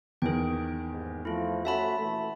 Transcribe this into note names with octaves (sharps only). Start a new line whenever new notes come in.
E2 D#3 G#4 G5
D#2 G#2
F3 A3 E4 F4
A3 C#4 F#4 E5 A5 B5
A#2 E3 A3